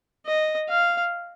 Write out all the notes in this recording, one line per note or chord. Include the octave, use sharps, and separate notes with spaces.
D#5
F5